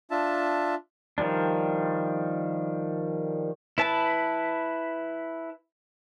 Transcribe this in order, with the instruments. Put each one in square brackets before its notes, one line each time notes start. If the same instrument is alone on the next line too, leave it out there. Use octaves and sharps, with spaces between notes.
[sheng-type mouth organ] D4 F4 E5 A5
[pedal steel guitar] D#3 F3 G3 D4
E4 B4 A5